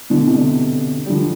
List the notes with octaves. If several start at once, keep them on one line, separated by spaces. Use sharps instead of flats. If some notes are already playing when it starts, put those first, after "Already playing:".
B2 D3
C3
B2 D3
G3
D3 F3